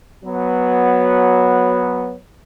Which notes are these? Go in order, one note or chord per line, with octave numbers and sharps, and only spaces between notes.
F#3 B3